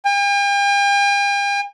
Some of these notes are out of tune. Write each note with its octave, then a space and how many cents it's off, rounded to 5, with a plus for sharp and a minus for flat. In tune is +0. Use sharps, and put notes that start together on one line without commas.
G5 +45